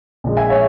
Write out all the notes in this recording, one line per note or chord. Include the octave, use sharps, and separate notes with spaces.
A#1 A#2 G#3
E5 G#5
C#5 E5